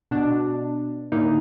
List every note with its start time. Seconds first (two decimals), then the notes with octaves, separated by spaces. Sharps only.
0.11 B2 D4
1.12 A2 D3 A#3 D#4 E4